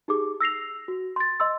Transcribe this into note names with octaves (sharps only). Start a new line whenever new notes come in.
D#4 G4 G#4 D6
E6 A#6 C7 F7
F#4
C6 A6
D#5 C6 E6